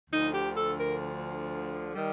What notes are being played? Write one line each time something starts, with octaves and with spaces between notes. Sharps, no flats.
D2 D3 F3 D#4
G4
A4
A#4
D#3 G3